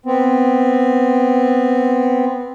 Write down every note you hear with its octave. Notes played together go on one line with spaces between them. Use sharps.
B3 C4